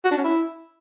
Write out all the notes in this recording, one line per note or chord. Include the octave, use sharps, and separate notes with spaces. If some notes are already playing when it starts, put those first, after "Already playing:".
F#4
D4
C#4
E4